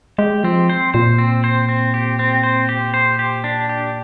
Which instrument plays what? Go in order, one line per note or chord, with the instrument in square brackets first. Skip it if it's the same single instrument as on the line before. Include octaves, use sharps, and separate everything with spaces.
[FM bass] G#3 [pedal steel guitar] G4
[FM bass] F3 [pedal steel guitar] C4
[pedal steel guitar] C5
[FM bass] A#2 [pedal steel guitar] C5
[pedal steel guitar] C4
C5
C4
G4
C4
C5
G4
C5
G4
D4
G4